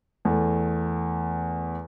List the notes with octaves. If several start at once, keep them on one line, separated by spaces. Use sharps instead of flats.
E2 A3